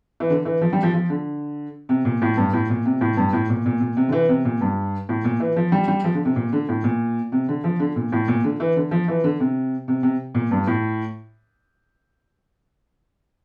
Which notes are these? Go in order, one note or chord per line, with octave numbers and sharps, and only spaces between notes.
E3
D3
E3
F3
G3
F3
F3
D3
C3
A#2
A2
G2
A2
A#2
C3
A2
G2
A2
A#2
A#2
A#2
C3
D3
E3
C3
A#2
G2
A2
A#2
E3
F3
G3
G3
F3
D3
C3
A#2
D3
A2
A#2
C3
D3
F3
D3
A#2
A2
A#2
D3
E3
D3
F3
E3
D3
C3
C3
C3
A#2
G2
A2